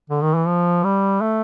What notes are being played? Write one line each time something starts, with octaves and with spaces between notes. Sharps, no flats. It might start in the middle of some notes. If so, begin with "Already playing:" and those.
D3
D#3
E3
F3
G3
A3